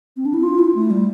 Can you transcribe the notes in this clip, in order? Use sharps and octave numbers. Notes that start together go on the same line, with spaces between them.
C4
D4
E4
F4
E4
A3
G3